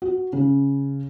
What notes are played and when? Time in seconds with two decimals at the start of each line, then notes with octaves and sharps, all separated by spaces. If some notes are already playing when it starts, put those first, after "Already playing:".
0.02 F#4
0.33 C#3